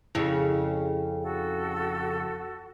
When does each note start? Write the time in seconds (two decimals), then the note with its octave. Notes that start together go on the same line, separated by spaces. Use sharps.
0.15 F2 C#3 E4 G#4
1.22 F#4 A4